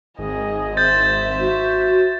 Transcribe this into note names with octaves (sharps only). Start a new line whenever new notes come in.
G#1 G#4 D#5
C5 E5 G6 A6
F#4